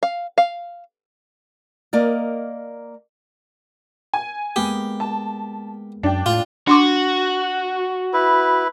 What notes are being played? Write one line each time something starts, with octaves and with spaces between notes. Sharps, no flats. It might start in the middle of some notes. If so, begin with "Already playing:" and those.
F5
F5
A#3 A#4 D5 D#5
G#5
G#3 A#3 B3 G4
A5
F#2 D4 G5 A5
A2 F4
D4 F#4 C6 D6
E4 B4